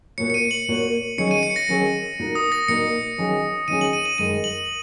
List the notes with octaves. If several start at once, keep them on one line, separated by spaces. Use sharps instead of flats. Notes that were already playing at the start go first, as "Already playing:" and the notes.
A#2 A#3 F#4 C#5 C#7
C#7
D#7
F#7
A#2 A#3 F#4 C#5
D#3 F#3 C#4 G#4 C#5 C#7
D#7
C#7
A#6
D#3 F#3 C#4 G#4 C#5
A#2 A#3 D#4 F#4 A#4
D#6
A#6
A#2 A#3 D#4 F#4 A#4 C#7
D#3 F#3 C#4 G#4
D#3 F#3 C#4 G#4 D#7
F#7
D#7
D#7
F#2 D#3 G#3 D#7
F#7